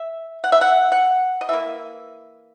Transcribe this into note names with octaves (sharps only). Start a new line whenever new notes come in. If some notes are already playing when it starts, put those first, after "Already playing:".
Already playing: E5
F#5
E5
F#5
F#5
D#5
E3 A#3 E5